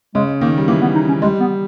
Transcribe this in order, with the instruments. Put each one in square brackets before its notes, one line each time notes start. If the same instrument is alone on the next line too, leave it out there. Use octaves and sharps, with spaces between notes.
[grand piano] C#3 [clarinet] G#3
[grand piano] D#3 [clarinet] A#3
[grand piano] G3
[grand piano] E3 [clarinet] A#3
[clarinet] B3
D#4
C#4
[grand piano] G3 [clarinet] G#3
[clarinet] B3